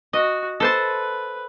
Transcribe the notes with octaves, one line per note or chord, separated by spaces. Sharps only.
F#4 D#5
A4 B4 C5 A5